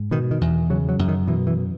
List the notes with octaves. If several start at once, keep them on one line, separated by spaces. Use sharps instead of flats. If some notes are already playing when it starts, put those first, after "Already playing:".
Already playing: G#2
B2 D#3
D#3
E2
C#3 F#3
F#3
F#2
D#3
B2 E3
E3